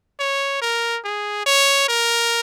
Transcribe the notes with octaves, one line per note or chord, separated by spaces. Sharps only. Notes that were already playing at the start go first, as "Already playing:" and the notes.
C#5
A#4
G#4
C#5
A#4